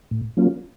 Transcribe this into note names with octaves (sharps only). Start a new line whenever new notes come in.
A2
F#3 A#3 C#4 F4